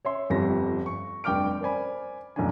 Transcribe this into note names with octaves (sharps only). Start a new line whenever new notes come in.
C#5 E5 C6
G1 F2 G3 A#6
C#6
F1 G2 G5 D6 F6 D7
A#4 C5 D5 G#5 B5
F#1 B1 A2 C#4 D4 G#5